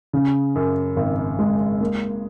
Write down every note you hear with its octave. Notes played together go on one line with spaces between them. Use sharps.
C#3
F#2
G#1
G#3
A#3